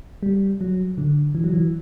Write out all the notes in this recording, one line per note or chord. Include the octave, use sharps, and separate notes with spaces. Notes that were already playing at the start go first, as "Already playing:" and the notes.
G3
F#3
D3
E3
F#3
E3